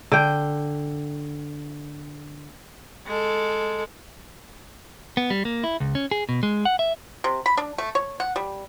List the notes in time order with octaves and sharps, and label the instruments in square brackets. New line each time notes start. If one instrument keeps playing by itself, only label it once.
[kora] D3 G5
[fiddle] G#3 A4
[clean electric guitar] B3
G3
A#3
E4
C#2
C#4
G#4
B2
G#3
F#5
E5
[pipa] C3
B5
D4
A3
C#5
F#5
G3